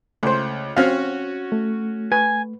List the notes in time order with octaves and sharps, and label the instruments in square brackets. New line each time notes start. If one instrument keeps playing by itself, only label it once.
[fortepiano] C#2 [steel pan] A3 C5
[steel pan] C4 F5 [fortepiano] C#4 F#4
[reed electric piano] A3
[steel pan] B4 [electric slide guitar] G#5